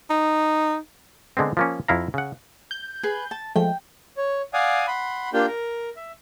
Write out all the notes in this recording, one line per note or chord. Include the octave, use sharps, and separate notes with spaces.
D#4
D3 G#3 B3 C4
F3 A#3 C#4
F2 E4 F5 A#5
C#3 F#5
G6
G#4 B4 B5
A5
F3 G#3 A3 G5
C#5
D5 F5 F#5 G#5 D#6
F#5 B5 C6
A#3 D4 F4 G4 G5
A#4
E5